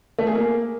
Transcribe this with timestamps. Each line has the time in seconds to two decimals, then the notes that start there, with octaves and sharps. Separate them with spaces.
0.19 A3
0.27 G#4
0.35 A#3